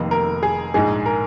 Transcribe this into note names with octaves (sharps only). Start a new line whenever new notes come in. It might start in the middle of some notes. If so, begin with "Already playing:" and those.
Already playing: F1 F2 D#3 A#3
A#4
G#4
A#1 G#2 G#3 D#4 G#4
A#4